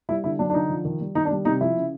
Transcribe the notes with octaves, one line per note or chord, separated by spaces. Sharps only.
G3 E4
D3 E4
F#3 D4
D4
D3 D#4
F3
D#3
G3
D#3 D#4
D4
G3
C3 D#4
F3 E4
C#3